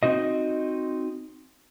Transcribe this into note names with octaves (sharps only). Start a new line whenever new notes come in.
C4 D#4 F#4 D#5